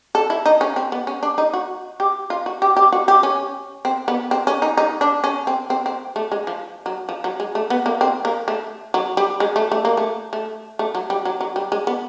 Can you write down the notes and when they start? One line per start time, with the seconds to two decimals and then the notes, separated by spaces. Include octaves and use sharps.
0.15 A4
0.30 E4
0.46 D#4
0.61 C#4
0.76 C4
0.92 B3
1.07 C#4
1.23 D4
1.38 D#4
1.53 F#4
2.00 G4
2.30 F4
2.46 F#4
2.62 G4
2.77 G4
2.92 F#4
3.08 G4
3.23 C#4
3.85 C4
4.08 B3
4.31 C4
4.47 C#4
4.62 D#4
4.77 D#4
5.01 D4
5.24 C#4
5.47 C4
5.70 C4
5.86 C4
6.16 A3
6.32 G#3
6.47 F3
6.86 F#3
7.09 F3
7.24 F#3
7.40 G#3
7.55 A3
7.70 B3
7.86 A#3
8.01 C4
8.25 A#3
8.48 A3
8.94 F#3
9.17 G3
9.40 G#3
9.56 A3
9.72 A3
9.85 A#3
9.97 A3
10.33 A3
10.79 A3
10.95 F#3
11.10 G3
11.25 F#3
11.41 F#3
11.56 G3
11.72 G#3
11.87 B3